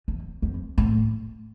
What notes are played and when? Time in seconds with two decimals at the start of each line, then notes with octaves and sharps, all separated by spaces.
0.08 E2
0.42 F2
0.78 A2